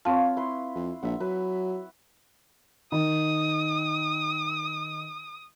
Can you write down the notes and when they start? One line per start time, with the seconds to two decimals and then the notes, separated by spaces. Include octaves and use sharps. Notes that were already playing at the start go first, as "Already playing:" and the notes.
0.05 C4 F4 B4 C#5 A5
0.36 E4 B4 C6
0.75 F2
1.03 A#1 E5 F#5
1.20 F#3 B4
2.92 D#3 D#6